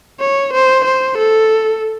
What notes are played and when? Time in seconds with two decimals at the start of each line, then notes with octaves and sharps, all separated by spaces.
0.20 C#5
0.53 C5
0.85 C5
1.18 A4